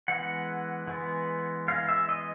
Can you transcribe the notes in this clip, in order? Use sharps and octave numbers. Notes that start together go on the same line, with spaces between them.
E3 G#3 B3 F#5
E3 G#3 B3
E3 G#3 B3 F5
E5
D#5